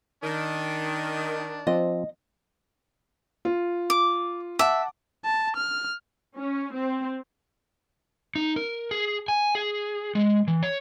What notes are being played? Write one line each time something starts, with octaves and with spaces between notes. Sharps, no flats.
D#3 D4
F3 C4 D#5
F4
D6
E5 F#5 A5 D6
A5
F6
C#4
C4
D#4
A#4
G#4
G#5
G#4
G#3
E3
C#5